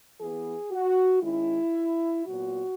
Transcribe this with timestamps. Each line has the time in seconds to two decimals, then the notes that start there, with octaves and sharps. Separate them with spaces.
0.19 E3 B3 G#4
0.71 F#4
1.22 D#3 G#3 C#4 E4
2.26 A#2 F#3 B3 F#4